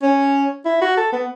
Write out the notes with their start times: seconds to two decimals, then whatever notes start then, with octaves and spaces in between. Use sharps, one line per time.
0.02 C#4
0.65 E4
0.82 F#4
0.97 A4
1.13 B3